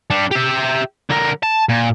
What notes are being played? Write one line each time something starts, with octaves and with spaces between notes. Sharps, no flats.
G3 D4
G4 E5
D3 A#4
A5
A#2